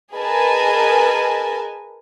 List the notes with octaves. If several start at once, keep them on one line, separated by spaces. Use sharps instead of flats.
G#4 A#4 B4 D#5 G#5 A5